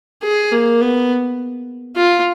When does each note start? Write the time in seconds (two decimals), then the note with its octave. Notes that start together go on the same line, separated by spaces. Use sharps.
0.23 G#4
0.52 A#3
0.81 B3
1.97 F4